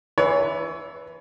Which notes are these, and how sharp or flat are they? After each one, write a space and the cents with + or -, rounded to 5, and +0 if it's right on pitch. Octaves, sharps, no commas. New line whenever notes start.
E3 +0 C#5 +35 B5 +0